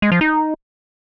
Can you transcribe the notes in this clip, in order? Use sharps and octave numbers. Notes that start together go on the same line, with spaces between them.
G#3
F3
D#4